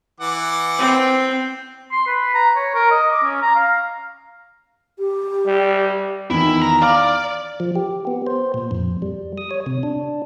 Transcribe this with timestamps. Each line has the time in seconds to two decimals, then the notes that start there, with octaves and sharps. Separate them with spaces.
0.20 E3 F#5 D6
0.79 C4
1.91 C6
2.07 B4
2.35 A#5
2.55 C#5
2.75 A#4
2.91 D#5
3.11 D6
3.23 C#4
3.42 A#5
3.55 F5
4.99 G4
5.46 G3
6.30 E2 D#3 E4
6.62 A#5
6.82 D5 F5 D6 F6
7.60 F3
7.75 G4
8.07 B3
8.27 C5
8.54 A#2
8.71 F2
9.02 G3
9.38 D#6
9.51 C#5
9.66 C3
9.83 D4